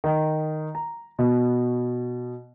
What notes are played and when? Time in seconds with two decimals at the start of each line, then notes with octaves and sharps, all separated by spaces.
0.04 D#3
0.75 A#5
1.19 B2